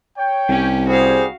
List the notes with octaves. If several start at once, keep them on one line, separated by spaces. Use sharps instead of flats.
C#5 G5
C2 C#4 G4
G3 F#4 G#4 C5 F5